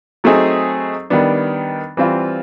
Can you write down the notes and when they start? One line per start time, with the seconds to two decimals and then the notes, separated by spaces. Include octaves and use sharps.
0.24 F#3 A3 C4 D#4 G#4
1.10 D#3 G3 B3 D4
1.97 E3 G3 C4 F4